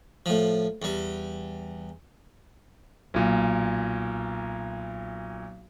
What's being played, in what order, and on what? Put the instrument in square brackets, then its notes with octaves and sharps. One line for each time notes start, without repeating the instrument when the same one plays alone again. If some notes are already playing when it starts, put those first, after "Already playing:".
[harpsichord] A2 F3
E2 G3
[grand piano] B1 A#2